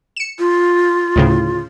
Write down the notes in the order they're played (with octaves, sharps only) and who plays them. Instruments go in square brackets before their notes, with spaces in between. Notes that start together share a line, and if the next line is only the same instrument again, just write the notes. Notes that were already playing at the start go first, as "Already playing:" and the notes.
[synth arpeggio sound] C#7 E7
[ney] F4
[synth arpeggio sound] D2 A2 C#3